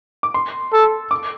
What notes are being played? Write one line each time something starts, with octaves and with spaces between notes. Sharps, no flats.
D6
C6
A4
D6